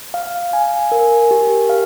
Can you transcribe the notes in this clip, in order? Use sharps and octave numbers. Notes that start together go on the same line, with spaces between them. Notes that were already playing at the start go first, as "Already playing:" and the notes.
F5
G#5
A#4
G4
F5